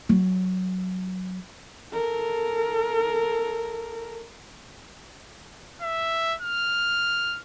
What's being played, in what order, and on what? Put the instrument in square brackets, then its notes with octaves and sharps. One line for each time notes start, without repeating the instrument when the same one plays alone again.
[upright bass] F#3
[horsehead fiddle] A4 A#4
[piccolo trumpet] E5
F6